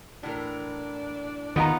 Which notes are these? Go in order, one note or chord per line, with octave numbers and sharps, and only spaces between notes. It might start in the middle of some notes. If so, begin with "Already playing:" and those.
A2 E3 D4 A#4
D#3 B3 D#4 F4 G4 A#5